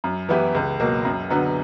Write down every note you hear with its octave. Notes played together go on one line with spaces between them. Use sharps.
F#2
E3 B3 E4 G4
C#2
B2 F#3 A#3
F#2
D3 F#3 B3